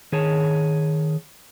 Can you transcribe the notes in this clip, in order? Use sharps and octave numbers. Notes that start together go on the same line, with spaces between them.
D#3 G#4 C#5 A5